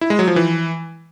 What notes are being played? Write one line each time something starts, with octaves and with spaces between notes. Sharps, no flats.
E4
G#3
F#3
F3
E3